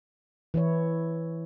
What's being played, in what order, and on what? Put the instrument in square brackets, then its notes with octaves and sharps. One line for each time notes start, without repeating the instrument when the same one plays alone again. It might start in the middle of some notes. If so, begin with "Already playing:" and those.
[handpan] E3 E4 C#5